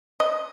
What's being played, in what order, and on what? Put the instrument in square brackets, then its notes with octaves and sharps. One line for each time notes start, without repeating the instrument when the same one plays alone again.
[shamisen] D#5